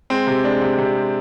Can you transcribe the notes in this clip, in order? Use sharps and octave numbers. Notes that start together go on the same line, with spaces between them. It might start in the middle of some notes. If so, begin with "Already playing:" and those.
G#3 C4
C3
G#3 D4
C3
C3
G#3